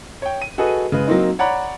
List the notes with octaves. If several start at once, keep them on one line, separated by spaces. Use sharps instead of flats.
C#5 G5
D#7
F#4 G#4 A4 B4 D#5
C#3 G#3 B4
F#3 A#3 C4 D#4
C#5 D5 F#5 A#5 B5